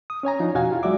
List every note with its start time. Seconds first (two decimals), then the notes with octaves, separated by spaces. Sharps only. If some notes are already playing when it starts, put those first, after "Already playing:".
0.10 D#6
0.23 C#4 C#5 G#5 A#5
0.40 F3 D4 D#4 F4
0.54 E2 B2 F#4 F5 G#5
0.71 E4 F4 G4
0.83 F#3 G#3 F#4 D5 E5 D6